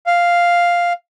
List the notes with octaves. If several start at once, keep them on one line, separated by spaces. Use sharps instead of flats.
F5